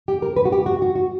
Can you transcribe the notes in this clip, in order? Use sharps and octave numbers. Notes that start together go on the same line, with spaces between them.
G4
A#4
B4
F#4
G4
F#4
F#4
F#4